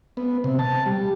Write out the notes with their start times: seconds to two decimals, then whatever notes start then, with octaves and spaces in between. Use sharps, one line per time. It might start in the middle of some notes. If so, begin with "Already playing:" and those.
0.17 B3
0.44 C3
0.59 A5
0.86 G3